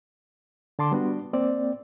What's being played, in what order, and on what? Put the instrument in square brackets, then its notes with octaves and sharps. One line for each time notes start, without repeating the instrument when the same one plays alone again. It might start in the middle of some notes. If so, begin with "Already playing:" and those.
[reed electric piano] D3 A5 C6 D6
G3 B3 D4 F#4
A#3 C4 D5